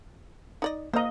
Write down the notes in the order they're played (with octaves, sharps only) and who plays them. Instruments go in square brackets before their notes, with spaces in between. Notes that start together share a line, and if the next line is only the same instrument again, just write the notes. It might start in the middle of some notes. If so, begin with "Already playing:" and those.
[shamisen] D#4 D5 D#5
[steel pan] A#3 D#5 [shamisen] C5 A#5